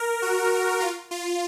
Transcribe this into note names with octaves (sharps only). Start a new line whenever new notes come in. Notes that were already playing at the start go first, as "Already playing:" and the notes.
Already playing: A#4
F#4
F4
F4